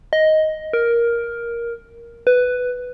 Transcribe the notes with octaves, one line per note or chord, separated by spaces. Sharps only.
D#5
A#4
B4